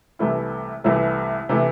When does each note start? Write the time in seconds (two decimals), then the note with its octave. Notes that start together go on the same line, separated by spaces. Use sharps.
0.19 C2 C3 E3 A3 E4
0.84 C2 C3 E3 A3 E4
1.49 C3 E3 A3 E4